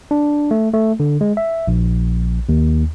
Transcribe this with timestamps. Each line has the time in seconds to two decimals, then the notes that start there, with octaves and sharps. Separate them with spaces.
0.11 D4
0.51 A3
0.74 A3
1.00 D3
1.21 G#3
1.37 E5
1.68 A#1
2.49 D#2